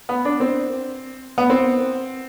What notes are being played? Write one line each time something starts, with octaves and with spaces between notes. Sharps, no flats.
B3
D4
C4
B3
C4